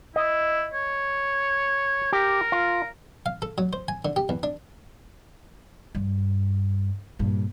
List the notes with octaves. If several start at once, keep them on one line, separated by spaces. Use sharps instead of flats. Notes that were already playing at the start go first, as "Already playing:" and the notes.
E4 D#5
C#5
G4 A#4
F4
F5
A4
F#3
C5
G#5
D3
G4
E2
D4
G2
G2 A#2